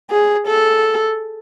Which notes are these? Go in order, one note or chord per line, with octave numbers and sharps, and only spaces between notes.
G#4
A4